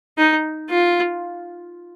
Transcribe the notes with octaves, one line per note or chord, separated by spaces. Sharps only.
D#4
F4